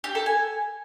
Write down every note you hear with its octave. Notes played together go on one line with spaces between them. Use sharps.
G4
A4
G#5